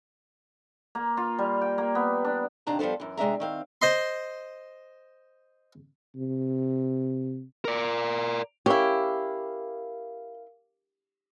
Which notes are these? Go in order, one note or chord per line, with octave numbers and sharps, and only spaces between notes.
A#3
F4
G3
G5
A#3
B3
D4
D#2 C3 D4 A5 A#5
F3 G3 B3 A4 C5
F#2 E3
C3 G#3 D4 E5 A#5
D#3 C4 F5
C5 D#5 C6
C3
A#4 D5
C#4 E4 G4 A#4 F5